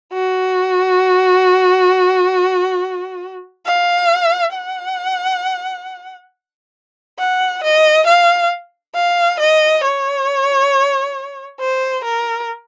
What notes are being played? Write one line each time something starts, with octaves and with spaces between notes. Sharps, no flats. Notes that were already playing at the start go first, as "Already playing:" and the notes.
F#4
F5
F#5
F#5
D#5
F5
F5
D#5
C#5
C5
A#4